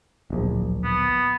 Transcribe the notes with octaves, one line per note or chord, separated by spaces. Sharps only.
D1 A#1
B3